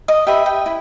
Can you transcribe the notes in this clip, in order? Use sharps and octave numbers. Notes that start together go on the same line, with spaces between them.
D#5
G4 B4 D#5 E5
G5
E4